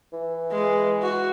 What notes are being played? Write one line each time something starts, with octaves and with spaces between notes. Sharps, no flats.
E3
G#3
F#4